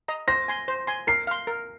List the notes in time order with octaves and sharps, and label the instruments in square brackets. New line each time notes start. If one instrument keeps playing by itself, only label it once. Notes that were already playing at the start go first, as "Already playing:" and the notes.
[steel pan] D#5 A#5
[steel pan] C5 [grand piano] A#6
[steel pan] G#5 C6
C5
G#5 C6
[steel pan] A#4 [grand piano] C7
[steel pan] F5 C6
A#4